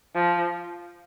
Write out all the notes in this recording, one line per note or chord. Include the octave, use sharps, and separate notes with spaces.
F3